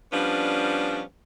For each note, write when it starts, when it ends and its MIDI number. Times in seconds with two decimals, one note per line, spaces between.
0.13 1.01 53
0.13 1.01 55
0.13 1.01 59
0.13 1.01 61
0.13 1.01 62